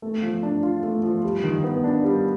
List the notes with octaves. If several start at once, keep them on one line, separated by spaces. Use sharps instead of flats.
A3
F3
D4
F4
A3
F3
G3
D#3
B3
D4
G3